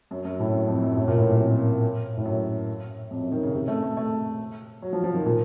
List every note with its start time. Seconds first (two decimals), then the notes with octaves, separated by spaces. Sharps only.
0.11 F#2
0.25 F#2
0.40 A2
0.54 F#2
0.67 F2
0.82 F#2
0.97 A2
1.08 A#2
1.18 A2
1.29 F#2
1.40 F2
2.17 A2
2.25 F#2
3.11 F2
3.21 F#2
3.32 D#3
3.43 C#3
3.54 C3
3.68 A3
3.83 A3
3.97 A3
4.82 F#3
4.93 F3
5.04 F3
5.14 D#3
5.26 A#2